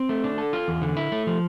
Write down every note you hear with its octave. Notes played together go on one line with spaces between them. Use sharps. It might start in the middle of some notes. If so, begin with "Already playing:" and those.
Already playing: C4
A3
D4
A4
F4
E2
D3
E4
A3
F3